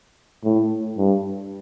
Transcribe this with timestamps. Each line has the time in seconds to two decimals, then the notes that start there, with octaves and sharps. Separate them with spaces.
0.44 A2
0.97 G2